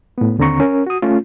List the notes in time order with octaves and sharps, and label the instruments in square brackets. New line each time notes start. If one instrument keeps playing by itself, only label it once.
[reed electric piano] A2 B3
D#2 D3 C4 A#5 C#6
C#4 A#4
F#4 D#6
A3 C#4 F4